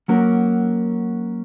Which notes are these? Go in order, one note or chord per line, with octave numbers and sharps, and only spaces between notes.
F#3 A#3 C#4 F#4 A#4